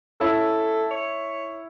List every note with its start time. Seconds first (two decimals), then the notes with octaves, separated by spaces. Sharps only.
0.20 C#4 E4 A4
0.91 C#5